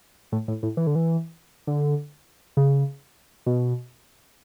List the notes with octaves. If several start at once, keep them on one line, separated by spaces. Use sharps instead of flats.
A2
A2
A2
E3
D3
E3
D3
C#3
B2